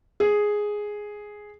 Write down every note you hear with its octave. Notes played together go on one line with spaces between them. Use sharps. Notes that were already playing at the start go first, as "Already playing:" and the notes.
G#4